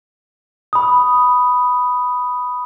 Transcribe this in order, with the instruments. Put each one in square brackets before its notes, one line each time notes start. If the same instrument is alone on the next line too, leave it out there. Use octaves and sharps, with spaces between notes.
[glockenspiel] B5 D#6